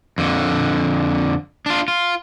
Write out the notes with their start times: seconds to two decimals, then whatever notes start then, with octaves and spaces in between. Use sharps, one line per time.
0.18 F2 D3
1.66 D4 F4
1.88 F4